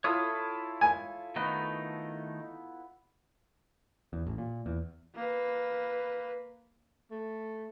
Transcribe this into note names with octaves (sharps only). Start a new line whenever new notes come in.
E4 F4 A4 C#5 D#6 E6
G#5
D#3 A3 B3 D#4
E2
A1
A#2
E2
A#3 B4
A3